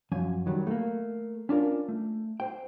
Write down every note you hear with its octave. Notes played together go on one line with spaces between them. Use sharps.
F#2 F3 C#4 G#5
D#3 F#3 G3
A3 A#3
C#4 D4 F4 A#4
A3
C5 G5